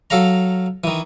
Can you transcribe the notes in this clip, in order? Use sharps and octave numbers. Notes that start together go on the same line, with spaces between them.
F#3 A4 F5 A#5
D#3 E3